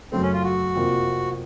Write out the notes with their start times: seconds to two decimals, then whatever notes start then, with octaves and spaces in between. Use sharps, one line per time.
0.12 F#2 C#3 A3 C4
0.22 C#4
0.33 F4
0.44 F#4
0.75 F2 C3 F3 A#3